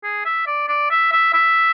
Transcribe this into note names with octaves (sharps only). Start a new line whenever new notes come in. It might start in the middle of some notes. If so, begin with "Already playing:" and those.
G#4
E5
D5
D5
E5
E5
E5